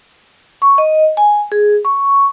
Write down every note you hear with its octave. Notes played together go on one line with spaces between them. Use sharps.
C#6
D#5
G#5
G#4
C#6